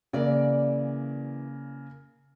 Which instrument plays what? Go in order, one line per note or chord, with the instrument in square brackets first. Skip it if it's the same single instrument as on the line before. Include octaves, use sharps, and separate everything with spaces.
[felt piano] C#3 A#3 [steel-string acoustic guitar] E3 D5